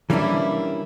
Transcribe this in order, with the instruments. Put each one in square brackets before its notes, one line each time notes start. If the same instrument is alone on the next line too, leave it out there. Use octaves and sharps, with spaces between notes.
[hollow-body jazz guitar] E3 G3 A#3 C#4 D4 E4